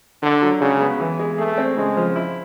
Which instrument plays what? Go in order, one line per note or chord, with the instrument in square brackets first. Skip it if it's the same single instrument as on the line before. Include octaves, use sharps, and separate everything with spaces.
[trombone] D3 [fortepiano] D4
[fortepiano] F#3
[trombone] C#3 [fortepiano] G#3
[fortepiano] B3
E3
G#3
[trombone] A3 [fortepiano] G#4
[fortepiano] C4
[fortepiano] C#3 [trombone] G#3
[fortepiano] F3
E4